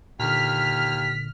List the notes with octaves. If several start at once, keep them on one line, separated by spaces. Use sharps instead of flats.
D#2 A#2 D3 F6 B6